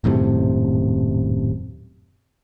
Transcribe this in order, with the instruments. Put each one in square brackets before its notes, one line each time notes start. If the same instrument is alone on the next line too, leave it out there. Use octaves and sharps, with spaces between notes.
[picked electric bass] D#1 F#2 A2 C3